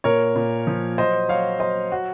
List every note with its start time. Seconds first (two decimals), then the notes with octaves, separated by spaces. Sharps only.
0.04 A#2 A#4 C#5
0.36 A#2
0.67 F3
0.98 F#3 C5 D#5
1.29 F#3 C#5 F5
1.60 F#3 C5 D#5
1.92 F#3 F#4